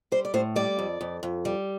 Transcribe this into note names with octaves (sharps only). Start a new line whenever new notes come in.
G3 C5
D5
A2 C5
G3 D5
F2
F2
F2
G3